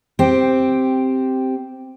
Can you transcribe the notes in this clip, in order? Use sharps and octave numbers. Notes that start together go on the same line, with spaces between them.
C4 G4